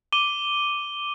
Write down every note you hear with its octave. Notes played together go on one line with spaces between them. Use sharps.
D6 D#7 G7